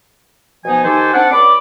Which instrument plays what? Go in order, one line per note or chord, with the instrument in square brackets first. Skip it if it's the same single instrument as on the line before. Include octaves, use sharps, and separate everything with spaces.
[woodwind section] B2 F3 B3 D#4 G#5
D#3 D#4 G4 A4 C5 G#5
C4 D4 F#5
C#2 D5 B5 D6